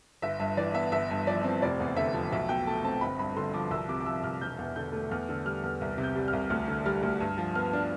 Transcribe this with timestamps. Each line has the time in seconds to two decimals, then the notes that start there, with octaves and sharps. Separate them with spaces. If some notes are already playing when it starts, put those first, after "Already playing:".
0.22 G1 E5
0.39 G2 E5
0.57 E3 D5
0.74 B3 E5
0.92 G1 E5
1.10 G2
1.27 F3 D5
1.44 C4
1.62 F1 D5
1.80 E2
1.97 D3 E5
2.14 F3
2.32 B1 E5
2.49 B2 G5
2.67 A3 A5
2.84 C4 A5
3.01 G1 B5
3.19 G2 B5
3.36 D3 C6
3.53 F3 D6
3.71 C2 E6
3.88 C3 D6
4.00 D6
4.06 F3 E6
4.23 C2 F6
4.41 E1 G6
4.59 E2
4.76 D3 G6
4.93 A3
5.11 E2 F6
5.29 D3
5.45 G3 F6
5.64 E2
5.81 C2
5.98 C3
6.03 G6
6.16 G3
6.28 F6
6.33 C2
6.50 D2 F6
6.68 D3
6.85 G3 F6
7.03 D2
7.20 G2
7.38 F3
7.55 B3 F6
7.73 D4